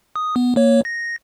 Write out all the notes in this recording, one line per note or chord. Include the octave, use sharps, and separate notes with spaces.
D#6
B3
A#3 C#5
A#6